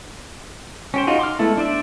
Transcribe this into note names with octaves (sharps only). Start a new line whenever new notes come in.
C#4 G4 C5
D#4 F4 F#4 G#4
C6 D6 F6
G#3 A3 B3 E4 A4
D4 C5 D5 E5